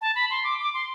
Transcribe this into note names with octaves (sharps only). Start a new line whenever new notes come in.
A5
B5
C6
D6
D6
C6